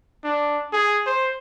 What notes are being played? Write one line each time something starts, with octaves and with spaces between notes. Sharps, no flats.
D4
G#4
C5